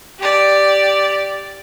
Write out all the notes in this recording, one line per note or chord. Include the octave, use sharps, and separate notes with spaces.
G4 D5